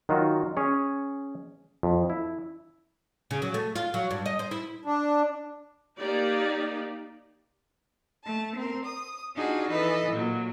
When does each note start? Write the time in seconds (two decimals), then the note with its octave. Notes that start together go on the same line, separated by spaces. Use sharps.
0.09 D#3 F#3 D#4 F4 F#4
0.57 C#4 G#4 C#5
1.83 F2
2.10 E4
3.31 C#3
3.42 F#3
3.54 A3
3.76 F4
3.94 F#3
4.11 G2
4.26 D#5
4.39 C5
4.51 E4
4.85 D4
5.97 A#3 D#4 G4 D5
8.24 A3 A5
8.55 C4 A#4
8.84 D#6
9.36 D4 D#4 F4 F#4 G#4
9.70 E3 A4 B4 D#5
10.10 A#2 F#3